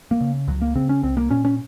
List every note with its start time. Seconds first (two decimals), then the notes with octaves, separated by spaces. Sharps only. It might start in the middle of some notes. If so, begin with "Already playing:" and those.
0.11 A#3
0.21 C#3
0.47 C#2 F#3
0.62 A#3
0.75 C#3 C4
0.89 C#4
1.03 C2 C4
1.17 A#3
1.30 A#2 C#4
1.45 C#4